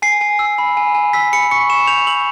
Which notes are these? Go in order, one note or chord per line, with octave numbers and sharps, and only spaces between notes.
G#5 C7
G#5
E6
B5
G#5
G#5
E6 B6
B5 C#7
C#6 C#7
C#6 E7
G6 F7
E6 F#7